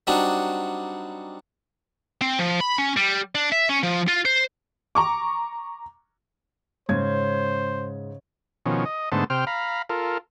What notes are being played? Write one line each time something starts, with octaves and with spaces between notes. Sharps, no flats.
F#3 G3 C4 D4 D#4 F#4
C4
F3
B5
C#4
G3
D4
E5
C#4
F3
F4
C5
A#5 C#6 D6
G#2 C#3 C5 G#6
B2 D#3 F3 C#4
D#5
G#2 D3 A3 B3 C5 A5
C3 C5 G5 F6
F5 A#5 B5
F4 A4 A#4